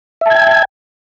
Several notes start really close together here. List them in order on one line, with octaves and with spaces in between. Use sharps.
E5 A5 G#6 G5